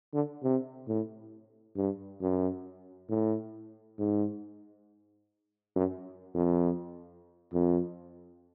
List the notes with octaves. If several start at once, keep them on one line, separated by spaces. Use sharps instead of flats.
D3
C3
A2
G2
F#2
A2
G#2
F#2
F2
F2